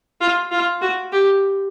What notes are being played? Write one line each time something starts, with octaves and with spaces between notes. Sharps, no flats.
F4
F4
F#4
G4